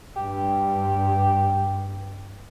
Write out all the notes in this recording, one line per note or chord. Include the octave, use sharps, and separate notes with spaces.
G2 G4